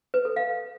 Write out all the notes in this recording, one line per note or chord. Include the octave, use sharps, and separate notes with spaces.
B4
A4
F5